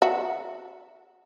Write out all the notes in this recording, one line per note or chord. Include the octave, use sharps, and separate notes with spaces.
F#4 E5